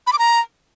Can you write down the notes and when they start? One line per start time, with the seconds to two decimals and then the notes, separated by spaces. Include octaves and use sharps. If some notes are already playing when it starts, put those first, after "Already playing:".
0.07 B5
0.13 D6
0.19 A#5